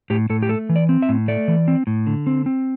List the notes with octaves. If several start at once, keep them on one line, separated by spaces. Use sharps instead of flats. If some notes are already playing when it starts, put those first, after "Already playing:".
A2 G4
A2 A4
G4
A3 A4
E3
D5
C4
E5
A2
A3 D5
E3
C4
A2
D3
C4
C4